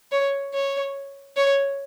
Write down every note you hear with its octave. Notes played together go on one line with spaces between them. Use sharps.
C#5
C#5
C#5